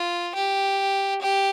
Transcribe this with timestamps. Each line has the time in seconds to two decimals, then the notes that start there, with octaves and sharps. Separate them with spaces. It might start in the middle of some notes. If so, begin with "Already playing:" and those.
Already playing: F4
0.35 G4
1.22 G4